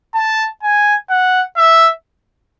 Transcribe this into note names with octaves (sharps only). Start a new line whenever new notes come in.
A5
G#5
F#5
E5